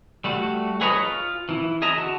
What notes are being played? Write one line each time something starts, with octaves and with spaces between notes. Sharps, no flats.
G3 A3 F#4
G#4 B4 C#5 D#5 A#5
F4
E3 E4
G#4 D#5 E5 A#5
D3 F#4 A5